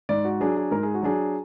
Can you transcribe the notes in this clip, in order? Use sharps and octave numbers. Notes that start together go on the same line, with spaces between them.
G#2 D5
F#4
F#3 D4 G#4
G#4
G#2 A#4
G#4
F#4
F#3 D4 G#4